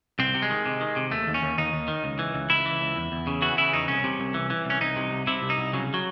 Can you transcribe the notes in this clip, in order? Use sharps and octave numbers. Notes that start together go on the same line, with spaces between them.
C2 C4
C3
G#3
D#3
C3
D#3
C3
D#2 A3
D#2
C#4
D#2
D#2 D#4
D#2
D#3
C#2
E3
C#2
C#2 E4
E3
C#2
E2
E2
C#3
E3 F#4
C#3 E4
E2 D#4
C2 C#4
C3
C2
E3
E3
C2 C#4
C2 D#4
C3
C2
C3 E4
C2
D#4
C2
C#3 F#3
F#3